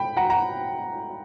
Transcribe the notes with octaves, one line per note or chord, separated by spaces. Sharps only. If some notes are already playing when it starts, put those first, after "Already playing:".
Already playing: G5 B5
F#5 A#5
F#5 A#5